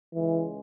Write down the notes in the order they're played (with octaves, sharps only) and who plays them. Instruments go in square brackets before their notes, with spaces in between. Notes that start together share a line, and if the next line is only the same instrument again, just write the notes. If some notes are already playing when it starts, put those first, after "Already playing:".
[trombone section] C#2 C#3 G#3 [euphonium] E3